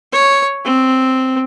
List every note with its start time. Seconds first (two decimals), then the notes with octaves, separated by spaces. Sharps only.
0.12 C#5
0.64 C4